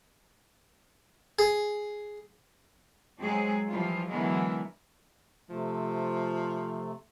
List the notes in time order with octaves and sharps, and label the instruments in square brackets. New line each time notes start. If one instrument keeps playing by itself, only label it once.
[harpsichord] G#4
[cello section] F#3 G#3 C4 G#4
E3 F3 G3 F4
D3 E3 F#3 G#3 B3 A#4
[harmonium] C3 A3 [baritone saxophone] F3